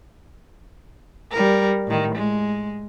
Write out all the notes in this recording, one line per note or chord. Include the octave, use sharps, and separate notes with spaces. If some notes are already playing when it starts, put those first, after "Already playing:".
G3 A#4
A2 D#3
G#3